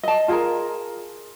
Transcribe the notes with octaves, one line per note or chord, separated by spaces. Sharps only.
D#5 A5
F4 G#4 A#4